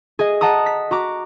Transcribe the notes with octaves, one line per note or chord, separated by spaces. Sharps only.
G#4 D#5
D#5 F#5 A5 A#5 D#6
B6
F#4 A#5 D6